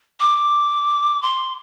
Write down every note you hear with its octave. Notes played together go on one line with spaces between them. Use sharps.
D6
C6